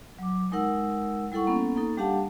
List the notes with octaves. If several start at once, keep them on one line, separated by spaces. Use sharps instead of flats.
F#3 D6
G#3 D#4 A#4 F#5 E6
G3 E4 A4 F#5 C#6
A#3 B3 C#4 A4
A#3 D#4 A4
G3 D4 G4 F5 F#5 A5